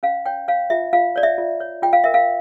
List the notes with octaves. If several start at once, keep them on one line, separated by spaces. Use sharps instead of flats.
C#4 F5
C#5 G5
C#5 F5
F4 E5
F4 F5
C#5 D5
E5
F4
C#5
F4 G5
F5
A#4 E5
F5